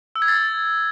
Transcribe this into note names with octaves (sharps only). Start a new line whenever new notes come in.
E6
G#6
A6